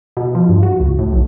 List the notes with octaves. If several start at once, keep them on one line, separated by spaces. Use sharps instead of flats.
B2
F3
G2
F#4
C#2
A2
B1